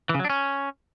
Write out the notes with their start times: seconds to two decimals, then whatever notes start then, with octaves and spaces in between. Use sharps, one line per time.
0.09 E3
0.14 C#3
0.19 F#3
0.25 D4
0.30 C#4